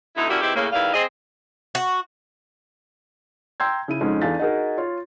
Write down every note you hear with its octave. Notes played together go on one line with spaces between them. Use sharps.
B2 D3 A3 D#4 E4
A#3 C#4 D4 E4 F#4 G4
E2 C4 D#4 E4 G4
A2 C#3 A#3
E2 D#3 G3 E4 F5
C4 G#4 D#5
F#4
G5 A#5 C6 E6 G6 G#6
C#3 E4 D#7
F2 G#2 G#3 C#4
E2 D4 A4 F5 A6 B6
D#4 F#4 G#4 A#4
F4 C#5